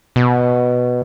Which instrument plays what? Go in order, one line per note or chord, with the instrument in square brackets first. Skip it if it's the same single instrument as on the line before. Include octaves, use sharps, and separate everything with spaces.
[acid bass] B2